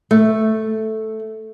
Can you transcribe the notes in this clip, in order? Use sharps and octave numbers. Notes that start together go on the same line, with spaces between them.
A3